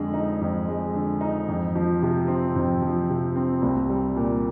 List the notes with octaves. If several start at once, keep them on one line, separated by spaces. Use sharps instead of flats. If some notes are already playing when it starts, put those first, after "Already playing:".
Already playing: F2 D3 G#3
D#4
F2
G#3
D3
D#4
F2
F3
C3
C4
F2
F3
C3
C4
C2
G3
A#2